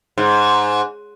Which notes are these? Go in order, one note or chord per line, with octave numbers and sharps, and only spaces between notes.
G#2